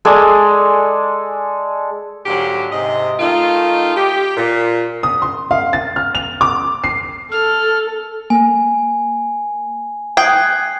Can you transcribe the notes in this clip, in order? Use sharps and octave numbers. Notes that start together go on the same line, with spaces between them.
G#3 A4 D5 G#5
G#2 D3 F#3 A#3 G4
G#2 C3 D#5
D#3 A3 D#4 F4
G4
A#2
D#6
C6
F5
A6
F6
F7
D6
C7
A4 F6
A#3 G#5
G5 D#6 F#6 G#6 C7